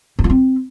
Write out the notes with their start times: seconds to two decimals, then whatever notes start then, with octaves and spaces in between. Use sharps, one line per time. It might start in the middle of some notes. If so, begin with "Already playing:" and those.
0.19 E4
0.24 F4
0.30 C4